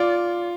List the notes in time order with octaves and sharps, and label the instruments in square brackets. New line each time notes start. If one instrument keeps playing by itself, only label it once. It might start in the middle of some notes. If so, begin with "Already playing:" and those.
Already playing: [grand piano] F4 [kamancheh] D5